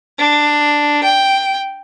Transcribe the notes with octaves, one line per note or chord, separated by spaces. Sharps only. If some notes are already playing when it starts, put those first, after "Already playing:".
D4
G5